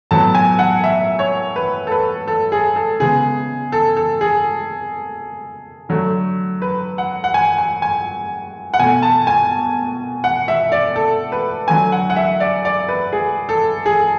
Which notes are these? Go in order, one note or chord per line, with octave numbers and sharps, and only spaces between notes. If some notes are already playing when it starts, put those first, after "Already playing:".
A2 F#3 B3 A5
G#5
F#5
E5
C#5
B4
A4
B4
A4
G#4
A4
C#3 G#3 B3 G#4
A4
A4
G#4
D3 F#3 A3
B4
F#5
F#5
G#5
G#5
G#5
F#5
B2 A3 G#5
A5
G#5
F#5
E5
D5
A4
B4
D3 F#3 A3 G#5
F#5
F#5
E5
D5
D5
B4
G#4
A4
G#4